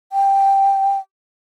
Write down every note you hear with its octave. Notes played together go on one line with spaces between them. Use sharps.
G5